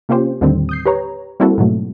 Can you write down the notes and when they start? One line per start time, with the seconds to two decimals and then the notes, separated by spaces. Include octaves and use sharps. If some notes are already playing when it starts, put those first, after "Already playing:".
0.09 C3 A#3 C#4 F4 G4 C5
0.41 D#2 A2 D3 D#3 G3 C4
0.69 D#6 G6 C7
0.86 G4 B4 C#5 A#5
1.40 G3 A#3 C4 E4 F#4 A4
1.58 G#2 B2 F#3 A3